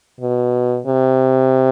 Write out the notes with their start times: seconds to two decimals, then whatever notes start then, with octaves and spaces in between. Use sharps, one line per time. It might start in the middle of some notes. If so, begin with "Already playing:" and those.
0.20 B2
0.87 C3